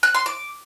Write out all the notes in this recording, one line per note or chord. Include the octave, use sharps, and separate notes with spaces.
F#6
C6
D6